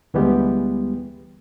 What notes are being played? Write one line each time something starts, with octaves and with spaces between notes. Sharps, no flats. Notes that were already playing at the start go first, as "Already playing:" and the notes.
D2 E3 G3 G#3 B3 G4